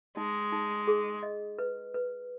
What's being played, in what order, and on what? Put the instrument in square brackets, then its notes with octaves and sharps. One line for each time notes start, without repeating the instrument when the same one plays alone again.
[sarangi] G#3 [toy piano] D#4
[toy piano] D#4
G#4
D#5
B4
B4